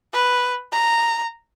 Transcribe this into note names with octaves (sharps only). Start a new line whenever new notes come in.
B4
A#5